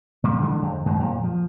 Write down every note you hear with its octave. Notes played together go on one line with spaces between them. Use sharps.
A#2 G3
D3 E3 G#3
F2
F#2 D#3 G#3
F2 A#2
F3